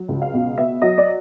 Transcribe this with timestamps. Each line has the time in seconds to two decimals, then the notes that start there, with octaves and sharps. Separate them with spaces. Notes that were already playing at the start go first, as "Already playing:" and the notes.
Already playing: F#3
0.08 C#2
0.22 F5
0.34 B2
0.58 B3 E5
0.82 F#3 D#5
0.98 D5